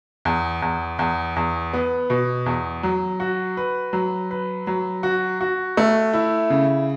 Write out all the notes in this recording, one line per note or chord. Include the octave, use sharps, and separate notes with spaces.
E2
E2
E2
E2
B3
B2
E2
F#3
F#4
B4
F#3
B4
F#3
F#4
F#4
A3
E4
C#3